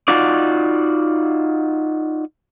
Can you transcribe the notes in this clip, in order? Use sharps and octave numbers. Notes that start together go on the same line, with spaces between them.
D#4 F4 F#4 D5